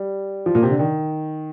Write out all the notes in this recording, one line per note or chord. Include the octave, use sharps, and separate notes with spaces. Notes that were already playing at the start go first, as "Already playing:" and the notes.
Already playing: G3
F3
A#2
C3
D3
D#3